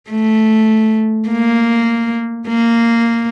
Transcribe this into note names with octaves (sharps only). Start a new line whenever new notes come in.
A3
A#3
A#3